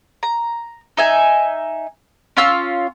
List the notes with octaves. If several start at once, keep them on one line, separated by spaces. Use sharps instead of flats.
A#5
D#4 E5 G#5
C#4 F4 E6